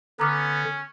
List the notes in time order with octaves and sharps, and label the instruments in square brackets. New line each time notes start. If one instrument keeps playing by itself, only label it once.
[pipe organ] D3 [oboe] B3 [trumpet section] C#4 [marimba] A#5 D6 F6